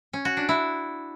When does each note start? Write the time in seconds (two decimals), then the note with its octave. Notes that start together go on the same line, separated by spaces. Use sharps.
0.13 C#4
0.25 F#4
0.37 D4
0.49 E4